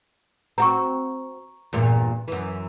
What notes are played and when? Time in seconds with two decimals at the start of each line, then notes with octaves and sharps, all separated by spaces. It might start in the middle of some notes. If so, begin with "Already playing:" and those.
0.58 C4 F#4 A#5 C#6
1.73 E2 G2 A#2
2.28 F#2 E3